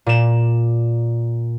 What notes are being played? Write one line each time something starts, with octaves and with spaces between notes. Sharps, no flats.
A#2 E7